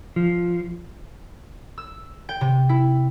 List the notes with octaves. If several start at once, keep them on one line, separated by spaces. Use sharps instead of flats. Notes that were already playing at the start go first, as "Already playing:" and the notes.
F3
E6
G5
C3
E4